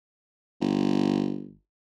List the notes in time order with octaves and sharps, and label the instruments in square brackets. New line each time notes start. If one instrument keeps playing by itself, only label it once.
[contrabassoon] G1